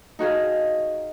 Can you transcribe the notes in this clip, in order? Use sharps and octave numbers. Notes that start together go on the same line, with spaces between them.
D#4 F#4 G#4 F5